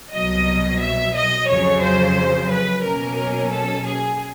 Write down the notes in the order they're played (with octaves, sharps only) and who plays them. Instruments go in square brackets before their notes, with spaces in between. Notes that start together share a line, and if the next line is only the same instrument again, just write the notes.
[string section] C2 B2 F#3 D#5
E5
D#5
F2 C#3 F#3 C#5
C5
B4
B2 F#3 A#3 C#4 A#4
A4
G#4